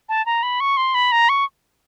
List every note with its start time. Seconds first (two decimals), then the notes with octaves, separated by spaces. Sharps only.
0.09 A5
0.26 A#5
0.43 B5
0.60 C#6
0.77 C6
0.95 B5
1.12 A#5
1.29 C#6